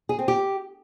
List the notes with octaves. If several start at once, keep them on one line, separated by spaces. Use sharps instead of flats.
G#4
C4
G4